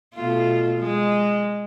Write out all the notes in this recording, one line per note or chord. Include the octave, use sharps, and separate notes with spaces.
B2 A3 F4
G#3